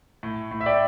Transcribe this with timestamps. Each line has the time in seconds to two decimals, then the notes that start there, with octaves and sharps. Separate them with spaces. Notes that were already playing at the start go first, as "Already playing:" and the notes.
0.23 A2
0.51 A2
0.61 E5
0.66 D5 G5